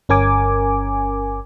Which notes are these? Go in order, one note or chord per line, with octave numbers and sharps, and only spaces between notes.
G1 C#4 A#4 G#5 D6